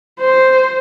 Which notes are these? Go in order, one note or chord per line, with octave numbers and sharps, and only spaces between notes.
C5